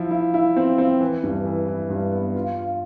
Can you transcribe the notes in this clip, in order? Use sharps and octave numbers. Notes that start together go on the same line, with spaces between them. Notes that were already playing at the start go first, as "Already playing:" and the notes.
Already playing: F3 E4
E4
E4
C4
C4
E3
G2
E3
E3
G2
B3
F4
F4